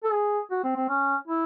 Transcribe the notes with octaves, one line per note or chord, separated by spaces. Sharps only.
A4
G#4
F#4
C4
C4
C#4
E4